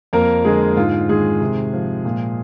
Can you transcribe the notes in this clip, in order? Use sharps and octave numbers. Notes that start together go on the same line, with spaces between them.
F2 A#3 A#4
D3 G#3 G#4
G#2 F4
D#3 G#3 G#4
C3
F3
A#2